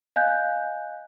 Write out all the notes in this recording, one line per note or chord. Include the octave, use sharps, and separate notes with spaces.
D#5 F5 G#5 F#6 G6